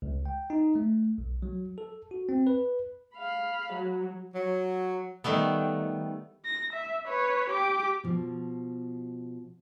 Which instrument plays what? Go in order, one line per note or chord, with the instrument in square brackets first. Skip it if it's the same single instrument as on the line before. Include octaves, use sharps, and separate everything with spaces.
[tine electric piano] C#2
G5
D#4
A3
B1
F#3
A4
F#4
C4
B4
[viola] F5 B5
F#3
[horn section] F#3
[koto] D#3 G3 A3 B3
[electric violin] A#6
E5
B4 C#5
G4 D6
[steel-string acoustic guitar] B2 F3